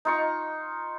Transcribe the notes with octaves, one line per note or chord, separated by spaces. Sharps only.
D#4 F4 C#6